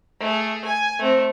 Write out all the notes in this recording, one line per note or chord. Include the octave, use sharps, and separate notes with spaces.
A3 G#4
G#5
A3 C4